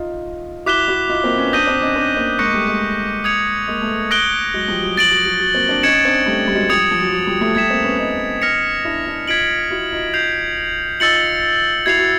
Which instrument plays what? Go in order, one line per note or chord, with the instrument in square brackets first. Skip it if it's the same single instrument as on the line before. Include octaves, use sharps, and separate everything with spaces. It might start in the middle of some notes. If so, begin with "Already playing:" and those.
Already playing: [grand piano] D#4 F4
[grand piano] E4 F#4 [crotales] D6 F#6 B6 E7 G7
[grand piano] E4 F#4
D#4 F4
A#3 C4
B3 C#4
[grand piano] C4 D4 [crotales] D#6 G6 A#6 D#7 G7
[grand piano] C4 D4
C#4 D#4
C4 D4
A#3 C4
[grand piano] G#3 A#3 [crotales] C#6 F#6 A#6 C#7
[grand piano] G3 A3
G#3 A#3
[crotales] D#6 G#6 C#7 F7
[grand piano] G#3 A#3
A3 B3
[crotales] D#6 F#6 A#6 D7 G7
[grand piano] F#3 G#3
F3 G3
F#3
[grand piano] F3 [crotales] A6 D7 F#7
[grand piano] F#3
F#3
F#3
A#3 C4
C4 D4
[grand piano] C#4 D#4 [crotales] G#6 C#7 E7
[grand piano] C4 D4
G3 A3
G3
F#3 G#3
[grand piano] F3 G3 [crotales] D#6 G#6 C#7 F7
[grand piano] F3
F#3
F#3
F3 G3
G3 A3
[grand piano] G3 A3 [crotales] G#6 B6 E7
[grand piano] A#3 C4
B3 C#4
C#4 D#4
[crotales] F6 A#6 C#7 F7
[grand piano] D4 E4
D4 E4
[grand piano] D#4 F4 [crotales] G#6 B6 D7 F#7
[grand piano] E4 F#4
D#4 F4
[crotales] G6 C7 F7
[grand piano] D#4 F4 [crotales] E6 A6 C#7 F#7
[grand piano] E4 F#4 [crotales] G#6 C7 F7
[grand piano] F#4